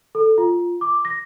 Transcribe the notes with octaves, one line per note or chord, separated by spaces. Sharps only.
A4
F4
D6
A#6